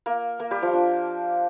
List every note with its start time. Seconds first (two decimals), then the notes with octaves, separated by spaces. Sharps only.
0.06 A#3 A#4
0.40 A#3 A#4
0.51 G3 G4
0.62 F3 F4
0.73 D4